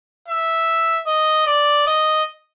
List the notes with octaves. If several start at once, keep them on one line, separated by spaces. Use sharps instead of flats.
E5
D#5
D5
D#5